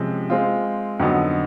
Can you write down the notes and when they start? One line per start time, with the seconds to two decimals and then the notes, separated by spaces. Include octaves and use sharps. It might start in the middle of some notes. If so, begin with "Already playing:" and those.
Already playing: C3 F3 G#3 C#4
0.30 G#3 C4 F4
1.00 F2 D3 F#3 B3 D#4